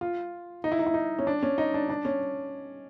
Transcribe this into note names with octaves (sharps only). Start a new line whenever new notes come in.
F4
D#4
E4
D#4
E4
D#4
C#4
D4
C#4
D#4
D4
D4
C#4